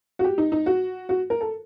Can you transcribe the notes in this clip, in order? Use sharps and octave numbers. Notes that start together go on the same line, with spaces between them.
F#4
G4
D#4
D#4
F#4
F#4
A#4
A4